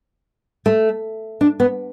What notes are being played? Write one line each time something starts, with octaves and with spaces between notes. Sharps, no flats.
A3
D4
B3